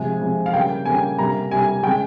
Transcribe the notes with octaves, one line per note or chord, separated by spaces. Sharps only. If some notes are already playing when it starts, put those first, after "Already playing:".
Already playing: C3 F3 G#3 G#5
C3 F3 G#3
F5
C#3 G3 A#3 G5
C#3 G3 A#3 G#5
C3 G3 A#3 A#5
C3 G3 A#3 G#5
C#3 G#3 G5